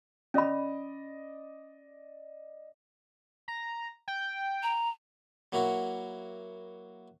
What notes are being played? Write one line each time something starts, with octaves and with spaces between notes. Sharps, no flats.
C#4 D5 D#5 B5
A#5
G5
A#5
F#3 A#3 E4 F#4